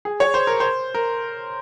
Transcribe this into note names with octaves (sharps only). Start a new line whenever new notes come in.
G#4
C#5
C5
A#4
C5
A#4